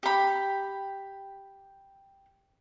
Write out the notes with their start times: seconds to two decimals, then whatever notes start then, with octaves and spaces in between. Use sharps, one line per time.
0.03 G4 B5